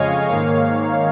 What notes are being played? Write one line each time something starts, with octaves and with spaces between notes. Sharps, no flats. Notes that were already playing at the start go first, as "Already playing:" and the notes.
Already playing: F2 C#3 G#3 C#5 D#5 F5 G#5
G#2 D#3 A#3 C#5 F5